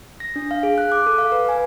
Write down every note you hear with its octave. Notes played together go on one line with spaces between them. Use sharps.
A#6
D4
F5
G#4
F#6
D6
A4
F5
B4
G#5